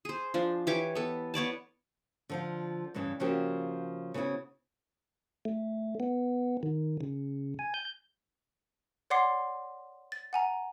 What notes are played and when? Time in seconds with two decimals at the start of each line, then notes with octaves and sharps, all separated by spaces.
0.05 G#4 C5
0.34 F3 D4
0.67 E3 G4 C#5 D6
0.95 B3 A4
1.34 B3 C#5 D5 A5
2.29 D3 F3 F4
2.94 G2 C#3 E3
3.20 C#3 F3 A#3 C4 F#4 G4
4.14 C#3 B3 C4 E4 F#4
5.45 A3
6.00 B3
6.63 D#3
7.01 C#3
7.59 G#5
7.74 G6
9.10 C#5 D5 F#5 C6 D6 C7
10.12 A6
10.33 F#5 G#5 A#5